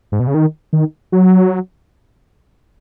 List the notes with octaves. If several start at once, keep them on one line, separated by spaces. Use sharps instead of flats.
G#2
B2
C#3
D#3
D#3
F#3